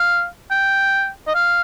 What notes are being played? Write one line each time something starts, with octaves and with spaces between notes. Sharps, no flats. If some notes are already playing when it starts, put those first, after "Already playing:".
Already playing: F5
G5
D#5
F5